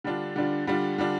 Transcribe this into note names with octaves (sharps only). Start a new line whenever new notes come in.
D3 G3 D4 F4
D3 G3 D4 F4
D3 G3 D4 F4
D3 G3 D4 F4